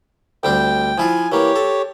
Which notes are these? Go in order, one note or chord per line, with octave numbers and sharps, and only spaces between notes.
D2 G3 C4 G5
F3 E4 F4 G#5
E3 A#3 G4 C#5
A4